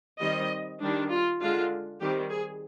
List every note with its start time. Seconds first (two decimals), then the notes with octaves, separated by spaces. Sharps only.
0.20 D#3 G3 C4 D#5
0.81 D#3 G3 D4
1.10 F4
1.41 D3 G#3 D4 F4
2.01 D#3 G3 C4 G4
2.30 G#4